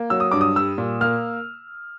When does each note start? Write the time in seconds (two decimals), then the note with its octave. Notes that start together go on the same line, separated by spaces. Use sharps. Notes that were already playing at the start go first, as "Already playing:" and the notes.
Already playing: A#3
0.10 F#3 E6
0.20 D#6
0.31 G2 D6
0.41 D#6
0.56 G3 E6
0.78 A#2
1.01 A#3 F6